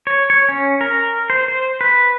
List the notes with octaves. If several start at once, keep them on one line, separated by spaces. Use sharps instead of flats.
C#5
C#5
C#4
A#4
C5
C5
B4